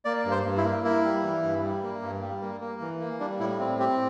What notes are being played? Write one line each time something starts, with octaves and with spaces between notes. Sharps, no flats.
A#3 D5
G2
C5
G2
E4
A#3
A#3 E4
G3
E3
G2
G3
A#3
G2
G3
A#3
A#3
E3
A#3
G3 D4
A2 E4
C4
C4 G4